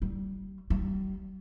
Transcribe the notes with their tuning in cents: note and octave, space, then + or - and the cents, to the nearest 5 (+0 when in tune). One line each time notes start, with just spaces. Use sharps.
G3 -30
G3 -35